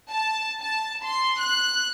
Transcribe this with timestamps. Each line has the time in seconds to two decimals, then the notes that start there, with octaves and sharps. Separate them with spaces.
0.10 A5
0.61 A5
1.04 C6
1.40 F#6